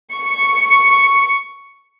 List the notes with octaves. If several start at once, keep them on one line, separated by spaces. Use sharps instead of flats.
C#6 C#7